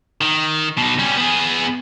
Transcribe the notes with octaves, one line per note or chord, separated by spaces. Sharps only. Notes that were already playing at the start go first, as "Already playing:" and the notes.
D#3
B2 D#4
G3 C#4
B3 G#4